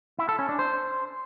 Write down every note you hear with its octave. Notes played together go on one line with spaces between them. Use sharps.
E4
A4
C#4
D4
C5